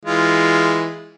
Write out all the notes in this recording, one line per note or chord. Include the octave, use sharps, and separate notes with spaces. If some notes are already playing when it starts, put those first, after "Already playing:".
E3 G#3 F4